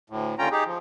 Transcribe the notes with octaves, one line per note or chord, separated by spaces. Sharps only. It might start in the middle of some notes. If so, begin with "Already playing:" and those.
D2 A2
D#2 D3 C#4 F4 G5 A#5
D#4 G4 G#4
F3